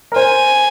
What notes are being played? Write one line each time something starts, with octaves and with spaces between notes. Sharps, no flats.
A#4
C5 G#5